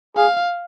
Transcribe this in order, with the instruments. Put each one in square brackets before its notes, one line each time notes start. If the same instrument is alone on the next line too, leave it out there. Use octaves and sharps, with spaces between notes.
[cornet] G#4 [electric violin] F5